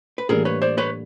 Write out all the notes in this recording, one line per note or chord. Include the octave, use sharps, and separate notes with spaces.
B4
A2 E3 G3 A#3 D4 G#4 A#4
B4 C#5
C5 D5
B4 C#5